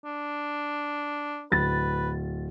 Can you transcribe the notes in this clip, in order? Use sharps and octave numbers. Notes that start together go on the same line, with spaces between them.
D4
D1 B4 A6